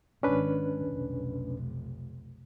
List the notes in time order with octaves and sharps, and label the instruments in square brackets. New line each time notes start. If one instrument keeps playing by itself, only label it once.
[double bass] G#1 D#3 [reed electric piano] C#4 D4 B4
[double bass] F1 B1